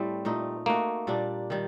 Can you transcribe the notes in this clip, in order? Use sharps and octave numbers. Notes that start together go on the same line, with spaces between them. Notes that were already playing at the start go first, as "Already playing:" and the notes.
Already playing: A2 G3 A3 C4
A#2 A3 D#4
A3 A#3 D#4 F#4
A#2 G3 D4
D#3 G3